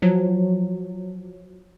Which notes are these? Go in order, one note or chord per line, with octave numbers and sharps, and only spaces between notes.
F3 F#3